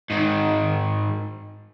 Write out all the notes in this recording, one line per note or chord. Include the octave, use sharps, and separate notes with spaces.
G#2 D#3